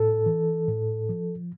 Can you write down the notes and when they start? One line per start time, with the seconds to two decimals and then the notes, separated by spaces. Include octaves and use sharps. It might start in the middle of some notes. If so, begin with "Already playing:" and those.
Already playing: A2 A4
0.26 E3
0.68 A2
1.09 F3